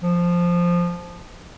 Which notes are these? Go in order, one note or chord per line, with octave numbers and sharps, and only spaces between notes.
F3